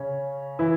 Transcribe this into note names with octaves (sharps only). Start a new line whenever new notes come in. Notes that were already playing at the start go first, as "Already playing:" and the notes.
Already playing: C#3 C#4
E3 E4